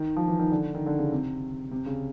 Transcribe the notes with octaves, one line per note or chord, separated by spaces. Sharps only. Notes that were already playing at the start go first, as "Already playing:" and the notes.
Already playing: D#3
F3
E3
D#3
D3
D#3
D3
C#3
C3
C3
C#3